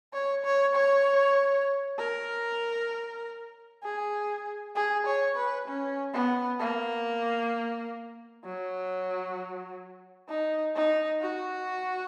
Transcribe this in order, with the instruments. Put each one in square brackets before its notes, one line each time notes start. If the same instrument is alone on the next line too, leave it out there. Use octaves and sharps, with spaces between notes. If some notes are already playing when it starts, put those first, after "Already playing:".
[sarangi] C#5
C#5
C#5
A#4
G#4
G#4
C#5
B4
C#4
B3
A#3
F#3
D#4
D#4
F#4